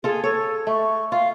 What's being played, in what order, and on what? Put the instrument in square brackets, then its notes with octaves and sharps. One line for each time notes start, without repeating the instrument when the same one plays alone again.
[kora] F4 A4 [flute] G#4
[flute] A4 [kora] C#5
[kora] A3 [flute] C#6
[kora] F4 [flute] F5